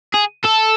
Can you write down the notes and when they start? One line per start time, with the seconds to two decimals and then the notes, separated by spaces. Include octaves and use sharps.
0.14 G#4
0.45 A4